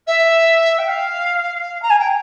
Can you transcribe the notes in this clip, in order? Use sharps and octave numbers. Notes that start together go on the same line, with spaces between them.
E5
G5
F5
A#5
G#5
G5